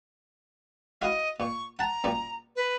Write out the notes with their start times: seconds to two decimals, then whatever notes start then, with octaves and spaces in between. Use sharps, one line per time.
1.02 E4 F#4 D#5 F5
1.40 A#2 C#6
1.79 F#5 A5 A#5
2.04 F#2 A#2 G3
2.56 B4